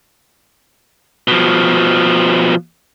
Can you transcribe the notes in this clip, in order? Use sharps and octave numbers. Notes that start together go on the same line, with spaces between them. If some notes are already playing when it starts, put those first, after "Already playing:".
B2 F3